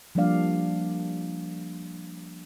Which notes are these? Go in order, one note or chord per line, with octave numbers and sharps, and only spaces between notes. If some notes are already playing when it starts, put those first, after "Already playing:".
F3 G3 A#3 D4 D5 F5